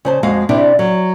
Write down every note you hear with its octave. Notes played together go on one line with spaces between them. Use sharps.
C#3 C5 A5
F2 G#3 F#4 F5
C3 D4 E4
F#3